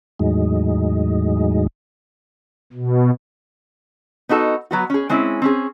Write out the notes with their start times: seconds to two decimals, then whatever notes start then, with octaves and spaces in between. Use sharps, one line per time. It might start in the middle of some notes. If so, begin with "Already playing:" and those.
0.20 E2 A2 F#3 G#3 D#4
2.73 B2
4.29 B3 D#4 F#4 A4
4.71 F#3 B3 F#4
4.90 C#4 G#4
5.09 G#3 C4 C#4 E4
5.42 C4 C#4 G#4